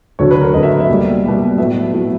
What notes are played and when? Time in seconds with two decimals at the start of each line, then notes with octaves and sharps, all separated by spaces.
0.19 D2 D3 F#3 C#5
0.31 B4
0.42 A#4
0.54 D2 D3 F#3 D#5
0.63 E5
0.80 E5
0.89 B2 G3 A#3
1.24 B2 G3 A#3
1.58 A2 F#3 B3 E5
1.93 A2 F#3 B3